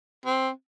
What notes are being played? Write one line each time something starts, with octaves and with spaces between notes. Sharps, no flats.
C4